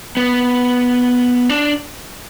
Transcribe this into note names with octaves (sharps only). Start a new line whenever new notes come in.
B3
D4